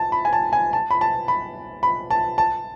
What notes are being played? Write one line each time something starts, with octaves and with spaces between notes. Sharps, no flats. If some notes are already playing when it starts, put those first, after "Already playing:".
Already playing: A5
B5
G#5
A5
G#5
A5
B5
A5
B5
B5
A5
A5